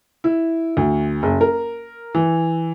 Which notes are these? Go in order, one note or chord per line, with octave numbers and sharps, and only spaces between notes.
E4
D2
F#1
A#4
E3